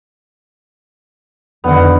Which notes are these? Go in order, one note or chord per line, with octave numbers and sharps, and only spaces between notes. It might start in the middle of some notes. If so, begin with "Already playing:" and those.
F2 D3 D#3 B3 F#5